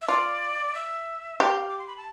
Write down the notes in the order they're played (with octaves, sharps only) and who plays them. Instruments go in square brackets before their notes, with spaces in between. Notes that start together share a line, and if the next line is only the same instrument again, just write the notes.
[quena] E5
[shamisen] F4 [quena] D5
[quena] E5
[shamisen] G4 [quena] F5
[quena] D6
C6
B5
A5